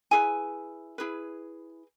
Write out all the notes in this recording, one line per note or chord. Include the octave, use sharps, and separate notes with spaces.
E4 G#4 B4 G#5
E4 G#4 B4